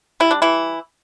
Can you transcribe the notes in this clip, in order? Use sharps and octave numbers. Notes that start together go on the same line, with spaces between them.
G3 E4
D4
E3 E4